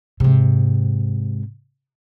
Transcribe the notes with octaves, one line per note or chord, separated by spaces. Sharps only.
G#2 C3